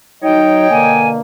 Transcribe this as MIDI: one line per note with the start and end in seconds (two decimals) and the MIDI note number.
0.22 0.70 54
0.22 0.70 63
0.22 1.00 73
0.22 1.00 75
0.22 1.00 79
0.70 1.20 47
0.70 1.20 50
0.70 1.20 58
0.70 1.08 80